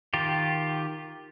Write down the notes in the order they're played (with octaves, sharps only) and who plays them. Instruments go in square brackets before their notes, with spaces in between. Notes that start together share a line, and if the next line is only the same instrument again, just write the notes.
[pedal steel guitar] D#3 F4 G4